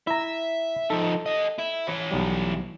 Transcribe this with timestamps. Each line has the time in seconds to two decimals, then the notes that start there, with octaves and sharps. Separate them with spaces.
0.07 E4 E5 A#5
0.90 F3 D#4 A4
1.26 G4 D#5
1.59 E4
1.89 E3 C#5
2.11 B1 G3